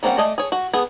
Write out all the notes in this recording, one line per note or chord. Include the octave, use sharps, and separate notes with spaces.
G3 A#3 C4 C#4 F#5
A3 D5 D#5 G#5
G#4 C#5
F#4
B3 G#4